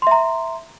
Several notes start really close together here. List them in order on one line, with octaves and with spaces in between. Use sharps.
C6 E5 A#5